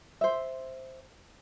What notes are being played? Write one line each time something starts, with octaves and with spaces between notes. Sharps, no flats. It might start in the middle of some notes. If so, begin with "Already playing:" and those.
C5 E5